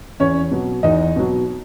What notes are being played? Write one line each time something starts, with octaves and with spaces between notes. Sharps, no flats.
E2 C#4 C#5
B2 F#3
E2 D#4 D#5
B2 F#3